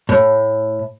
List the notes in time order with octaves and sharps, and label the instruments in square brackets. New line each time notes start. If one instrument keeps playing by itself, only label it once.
[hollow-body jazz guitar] A2